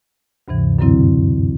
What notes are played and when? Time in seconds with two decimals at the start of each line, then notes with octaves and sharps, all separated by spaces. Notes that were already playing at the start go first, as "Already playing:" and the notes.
0.48 D2 G2 C3 E3
0.79 F#2 B2 D3 F#3 C4 E4